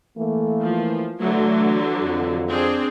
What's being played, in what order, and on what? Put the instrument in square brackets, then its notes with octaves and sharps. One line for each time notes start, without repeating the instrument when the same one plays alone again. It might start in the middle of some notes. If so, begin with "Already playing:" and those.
[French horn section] E3 A3 A#3
[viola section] F3
[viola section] D3 E3 F#3 [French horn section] A3
[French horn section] F2
[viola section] C4 D4 G#4